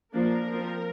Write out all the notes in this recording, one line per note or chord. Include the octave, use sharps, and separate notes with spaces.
F3 A#3 D4 A#4
F3 C4